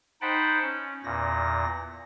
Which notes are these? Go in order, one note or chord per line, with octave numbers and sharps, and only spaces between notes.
D#4 C5 F#5 G5 A5 B5
C#4
E2 A#2 A#6